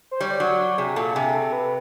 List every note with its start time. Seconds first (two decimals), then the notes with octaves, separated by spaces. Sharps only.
0.11 C5
0.20 G3 C#5
0.30 D5
0.40 F#3
0.78 C3 G#4
0.96 A#2 A4
1.15 C3 G#4
1.34 A4
1.53 B4